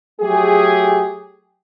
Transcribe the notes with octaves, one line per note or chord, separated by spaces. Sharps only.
F#3 A3 G4 G#4